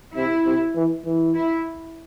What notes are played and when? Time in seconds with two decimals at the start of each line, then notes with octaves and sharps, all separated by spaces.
0.16 C3 E4
0.46 C3
0.75 E3
1.05 E3
1.35 E4